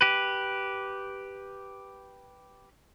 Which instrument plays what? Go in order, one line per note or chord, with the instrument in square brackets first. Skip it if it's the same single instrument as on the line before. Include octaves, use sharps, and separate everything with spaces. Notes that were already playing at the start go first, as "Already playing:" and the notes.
[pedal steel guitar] G4 B4